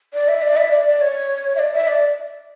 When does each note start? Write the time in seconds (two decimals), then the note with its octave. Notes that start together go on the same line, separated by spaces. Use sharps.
0.14 D5
0.28 E5
0.42 D5
0.57 E5
0.71 D5
0.86 D5
1.01 C#5
1.55 E5
1.59 D5
1.73 E5
1.88 D5